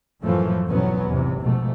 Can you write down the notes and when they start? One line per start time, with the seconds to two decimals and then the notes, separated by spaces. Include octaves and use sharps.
0.22 F#2 A2 E3 F3 A3
0.66 G#1 E2 B2 F#3 B3 C#4
1.05 G#1 E2 C3
1.40 G#2 B2 F3 A3